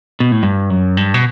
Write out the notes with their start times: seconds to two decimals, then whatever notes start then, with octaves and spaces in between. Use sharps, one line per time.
0.20 B2
0.32 A2
0.43 G2
0.70 F#2
0.97 G2
1.14 B2